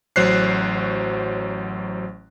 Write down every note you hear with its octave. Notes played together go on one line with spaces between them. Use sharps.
A1 F#3 C5 C#5 F#6 C7